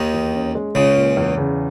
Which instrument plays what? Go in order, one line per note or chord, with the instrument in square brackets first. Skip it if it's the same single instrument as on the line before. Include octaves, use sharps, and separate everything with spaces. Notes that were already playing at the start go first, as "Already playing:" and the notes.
Already playing: [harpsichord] D#2 D#3
[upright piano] E2
C#4
G#3
[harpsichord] C#2 C#3 [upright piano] C#4
[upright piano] A#2
E2
C#3